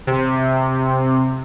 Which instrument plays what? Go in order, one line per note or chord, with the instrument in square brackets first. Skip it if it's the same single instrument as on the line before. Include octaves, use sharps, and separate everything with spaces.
[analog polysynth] C3